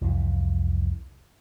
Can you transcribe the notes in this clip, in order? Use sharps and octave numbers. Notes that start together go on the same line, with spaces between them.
C2 F2 E3